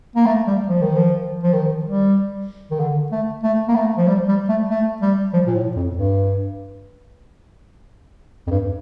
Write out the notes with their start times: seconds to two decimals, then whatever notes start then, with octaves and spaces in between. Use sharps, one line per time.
0.16 A#3
0.26 A3
0.47 G3
0.68 F3
0.81 D#3
0.96 F3
1.44 F3
1.53 D#3
1.85 G3
2.71 D#3
2.80 D3
3.12 A3
3.43 A3
3.68 A#3
3.76 A3
3.97 F3
4.07 G3
4.29 G3
4.49 A3
4.70 A3
5.02 G3
5.33 F3
5.47 A#2
5.55 A2
5.76 F2
5.97 G2
8.47 F2
8.51 G2